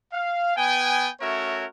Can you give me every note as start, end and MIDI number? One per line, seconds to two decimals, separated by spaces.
0.12 0.55 77
0.56 1.09 59
0.56 1.09 79
0.56 1.09 80
1.20 1.65 57
1.20 1.65 61
1.20 1.65 66
1.20 1.65 70
1.20 1.65 73
1.20 1.65 76